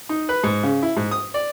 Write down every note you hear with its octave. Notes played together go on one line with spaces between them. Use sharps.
D#4
B4
G#2
C#3
E4
G#2
D#6
D5